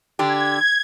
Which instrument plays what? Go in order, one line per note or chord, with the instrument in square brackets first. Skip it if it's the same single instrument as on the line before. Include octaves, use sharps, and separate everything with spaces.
[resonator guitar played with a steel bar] D3 D4 G4 [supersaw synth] G#6